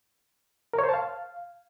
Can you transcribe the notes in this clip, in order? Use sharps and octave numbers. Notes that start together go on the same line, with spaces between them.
A#4
C#5
C5
A5
F5